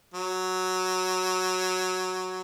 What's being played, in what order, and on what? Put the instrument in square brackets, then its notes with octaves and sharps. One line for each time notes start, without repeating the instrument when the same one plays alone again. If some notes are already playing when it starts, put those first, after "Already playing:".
[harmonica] F#3